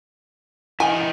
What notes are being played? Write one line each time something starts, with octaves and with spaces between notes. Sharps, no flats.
E4 D#5 G5 G#5